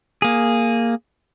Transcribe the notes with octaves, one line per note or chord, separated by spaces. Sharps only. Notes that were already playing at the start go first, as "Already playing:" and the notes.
A#3 G#4